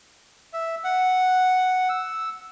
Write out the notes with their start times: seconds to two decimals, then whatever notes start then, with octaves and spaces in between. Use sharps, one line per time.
0.53 E5
0.84 F#5
1.89 E6